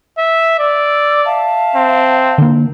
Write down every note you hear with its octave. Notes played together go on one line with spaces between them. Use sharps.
E5
D5 E6
E5 F5 A5
C4
D3 A#3